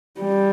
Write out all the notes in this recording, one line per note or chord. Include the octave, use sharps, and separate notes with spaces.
G3